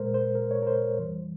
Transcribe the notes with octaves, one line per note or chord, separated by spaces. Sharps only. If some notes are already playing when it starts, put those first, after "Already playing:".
Already playing: A#2 G#3 A#4 C5
C5
A#4
C#5
A#4
C5
F2 E3 G3